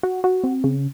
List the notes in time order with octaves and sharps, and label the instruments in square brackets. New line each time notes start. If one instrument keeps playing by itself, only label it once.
[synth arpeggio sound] F#4
F#4
C4
C#3